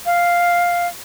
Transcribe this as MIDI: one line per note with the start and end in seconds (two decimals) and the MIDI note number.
0.06 0.87 77